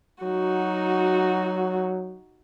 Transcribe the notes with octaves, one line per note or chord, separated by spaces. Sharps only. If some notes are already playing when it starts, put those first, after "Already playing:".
F#3 D#4 F#4